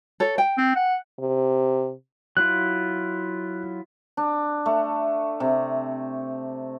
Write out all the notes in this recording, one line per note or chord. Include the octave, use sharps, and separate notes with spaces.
A4 C#5
G5
C4
F#5
C3
F#3 E4 F4 F#6
D4
A3
C3